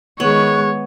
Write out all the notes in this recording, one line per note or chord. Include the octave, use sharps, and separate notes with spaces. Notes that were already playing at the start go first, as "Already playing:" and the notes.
D#3 G#3 B3 G#4 C#5 C#6 F#6